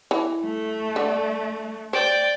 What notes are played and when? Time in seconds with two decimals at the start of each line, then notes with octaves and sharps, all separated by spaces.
0.11 E3
0.45 A3
0.96 D3
1.93 C5 D5 G5